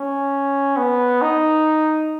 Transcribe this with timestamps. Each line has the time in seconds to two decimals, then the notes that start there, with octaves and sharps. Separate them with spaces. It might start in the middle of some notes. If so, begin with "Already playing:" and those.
Already playing: C#4
0.77 B3
1.22 D#4